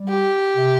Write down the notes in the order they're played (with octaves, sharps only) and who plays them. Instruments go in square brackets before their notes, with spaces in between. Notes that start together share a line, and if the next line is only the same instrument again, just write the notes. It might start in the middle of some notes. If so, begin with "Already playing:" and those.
Already playing: [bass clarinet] G3
[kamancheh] G4
[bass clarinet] C3